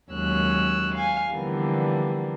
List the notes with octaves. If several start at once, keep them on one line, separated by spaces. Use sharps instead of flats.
D#2 F#3 G#3 C#4 E6 F#6
F5 G#5
D3 E3 F3 G3 A#3 B3